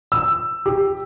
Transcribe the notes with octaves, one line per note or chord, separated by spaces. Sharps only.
E6
G4